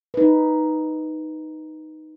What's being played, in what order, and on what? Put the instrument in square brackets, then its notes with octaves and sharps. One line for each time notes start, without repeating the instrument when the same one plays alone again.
[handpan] D#4 B4